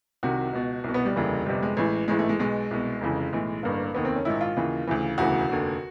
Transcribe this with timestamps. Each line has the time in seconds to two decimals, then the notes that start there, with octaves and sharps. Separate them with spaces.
0.23 C2 C3 D#3 F#4
0.53 C#2 B2
0.84 C2 B2
0.94 B3
1.05 G3
1.16 F1 D#2 C#3 E3
1.46 G1 F2 C3 G3
1.63 G#3
1.77 A1 A2 E3
2.08 A1 G#2 E3 G#3
2.19 A3
2.29 G#3
2.39 B1 B2 G#3
2.71 C2 B2
3.01 F1 F2 C#3 E3
3.33 B1 A2 E3
3.63 A1 G2 D3 A#3
3.95 F1 D#2 D#3 B3
4.05 C4
4.15 C#4
4.25 A#1 G#2 D#3 E4
4.41 F4
4.56 D#2 C#3 E3
4.87 D2 C#3 E3
5.18 E1 D2 C#3 E3 F#4
5.49 F1 D#2 D3